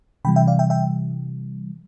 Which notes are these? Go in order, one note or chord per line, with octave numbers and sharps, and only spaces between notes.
C3 E3 G3 G5 B5
E5 G5
D5 F5
E5 G5
E5 G5